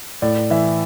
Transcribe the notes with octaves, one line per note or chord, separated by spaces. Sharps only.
A2 D5
E3 E5